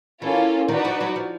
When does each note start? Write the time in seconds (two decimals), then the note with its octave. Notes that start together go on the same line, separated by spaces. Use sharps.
0.22 E3 A#3 C#4 F4 A4
0.68 D#3 D#4 F#4 B4 D5 F#5
0.85 F3
1.01 F#3
1.16 F3